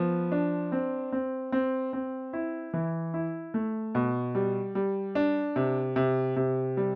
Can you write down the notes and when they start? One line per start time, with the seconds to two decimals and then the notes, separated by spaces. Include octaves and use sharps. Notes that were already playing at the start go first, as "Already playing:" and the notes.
Already playing: F3 B3
0.32 D4
0.72 C4
1.12 C4
1.52 C4
1.93 C4
2.33 E4
2.73 E3
3.14 E4
3.54 A3
3.95 B2
4.35 G3
4.75 G3
5.15 D4
5.56 C3
5.96 C3
6.36 C3
6.77 G3